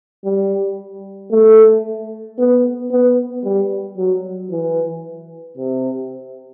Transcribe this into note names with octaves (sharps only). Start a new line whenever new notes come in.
G3
A3
B3
B3
G3
F#3
E3
C3